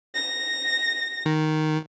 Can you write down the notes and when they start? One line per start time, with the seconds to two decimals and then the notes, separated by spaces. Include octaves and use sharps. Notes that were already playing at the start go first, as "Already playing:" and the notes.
0.14 A#6
1.26 D#3